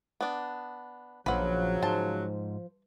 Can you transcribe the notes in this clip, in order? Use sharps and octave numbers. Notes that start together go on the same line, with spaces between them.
B3 D4
A#1 C#3 F3 F#3 B4 F#5
G#2 C5 A5